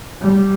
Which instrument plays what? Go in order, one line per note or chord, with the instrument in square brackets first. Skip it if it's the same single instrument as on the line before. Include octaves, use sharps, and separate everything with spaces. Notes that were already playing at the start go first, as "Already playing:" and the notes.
[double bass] G3